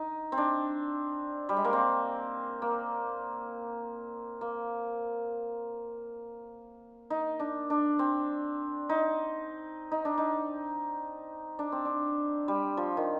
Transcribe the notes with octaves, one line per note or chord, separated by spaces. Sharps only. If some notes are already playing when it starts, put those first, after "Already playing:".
Already playing: D#4
C4
D4
G3
G#3
A#3
C4
A#3
A#3
D#4
D4
D4
C4
D#4
D#4
D4
D#4
D4
C4
D4
G3
F3
D#3